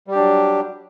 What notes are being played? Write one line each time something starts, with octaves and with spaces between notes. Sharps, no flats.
F#3 G3 D4 G4